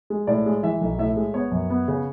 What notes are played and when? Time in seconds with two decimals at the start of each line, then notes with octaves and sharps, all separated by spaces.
0.10 G#3
0.27 A2 D5
0.46 G#3
0.63 E3 E5
0.81 B1
0.98 A2 E5
1.17 G#3
1.34 B3 C#5
1.52 F#2
1.70 B3
1.88 C#3